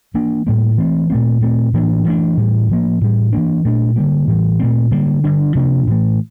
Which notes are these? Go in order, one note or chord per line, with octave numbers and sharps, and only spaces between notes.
E3 A#3 D4
A2 G3 A#3
E3 A3 C4
A#2 A3 C4
A#2 A3 C4
A2 E3 A#3 D4
E3 A3 D4
A2 E3 G3
A2 F3 A#3
A2 E3 G3
E3 A#3 D4
A#2 A3 D4
D3 G3 A#3
A2 E3 G3
A#2 A3 C4
D3 G3 A#3
D3 G3 D4
C3 F3 A#3 D4
A2 E3 A3